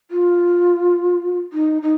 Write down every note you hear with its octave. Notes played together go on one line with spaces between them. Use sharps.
F4
D#4
D#4